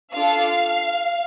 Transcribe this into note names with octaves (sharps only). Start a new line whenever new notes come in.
D4 F4 A4 F5